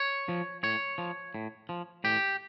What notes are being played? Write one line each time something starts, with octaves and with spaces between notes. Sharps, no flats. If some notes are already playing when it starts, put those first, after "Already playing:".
Already playing: C#5
F3
A2 C#5
F3
A2
F3
A2 G4